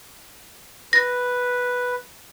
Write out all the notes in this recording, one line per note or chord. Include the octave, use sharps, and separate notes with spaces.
B4 A#6